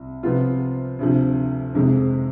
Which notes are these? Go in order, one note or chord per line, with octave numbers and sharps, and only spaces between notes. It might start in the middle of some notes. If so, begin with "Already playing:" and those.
Already playing: C2
C3 F3 B3 F4
D2 C3 F3
F2 C3 D#3 G#3